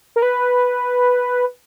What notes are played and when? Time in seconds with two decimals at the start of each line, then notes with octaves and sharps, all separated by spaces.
0.16 A#4
0.22 B4